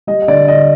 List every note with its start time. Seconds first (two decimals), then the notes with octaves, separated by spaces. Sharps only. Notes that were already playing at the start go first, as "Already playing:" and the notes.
0.07 G3 D#5
0.22 D#5
0.28 D3 D5
0.48 D3 D#5